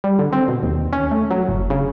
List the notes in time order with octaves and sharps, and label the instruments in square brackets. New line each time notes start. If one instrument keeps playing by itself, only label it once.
[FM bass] G3
D3
C4
B2
D#2
C#4
A3
F#3
F#1
C#3